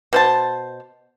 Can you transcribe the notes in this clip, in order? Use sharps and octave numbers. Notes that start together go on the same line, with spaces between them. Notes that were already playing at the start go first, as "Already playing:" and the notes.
B2 C5 A5